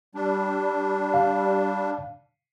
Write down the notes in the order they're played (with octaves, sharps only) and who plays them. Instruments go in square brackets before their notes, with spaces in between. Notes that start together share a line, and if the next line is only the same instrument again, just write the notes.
[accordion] G3 D4
[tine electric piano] F5